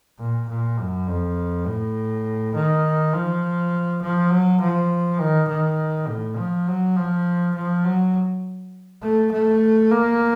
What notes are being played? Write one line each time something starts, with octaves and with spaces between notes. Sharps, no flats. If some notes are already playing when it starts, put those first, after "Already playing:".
A#2
A#2
F#2
F2
A2
D#3
F3
F3
F#3
F3
D#3
D#3
A2
F3
F#3
F3
F3
F#3
A3
A3
A#3